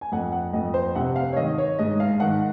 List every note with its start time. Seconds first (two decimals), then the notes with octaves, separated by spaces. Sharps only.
0.01 G#5
0.12 F2 F#5
0.32 F#5
0.53 F2 D#5
0.74 C5
0.95 C3 F#5
1.16 F5
1.33 C#5
1.36 D#3 D#5
1.58 C#5
1.78 G#2 D#5
2.00 F5
2.20 D#3 F#5